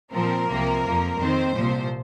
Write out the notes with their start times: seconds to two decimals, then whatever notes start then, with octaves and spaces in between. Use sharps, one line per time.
0.13 A#2 F3 C4 A#4
0.49 C2 C3 F3 A#3
0.84 F2 F3 A#3
1.20 F2 D#3 C4 C5
1.55 C2 A#2 F3